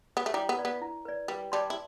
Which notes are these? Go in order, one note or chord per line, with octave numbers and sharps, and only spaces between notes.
B3
A3
G3 E4
B3
B4 D5
B3
E4
B4 D5
G3 B4
G3 D5 A5 C6
E4